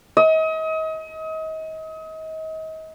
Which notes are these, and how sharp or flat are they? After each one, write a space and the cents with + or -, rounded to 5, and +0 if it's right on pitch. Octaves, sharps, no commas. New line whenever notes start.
D#5 +35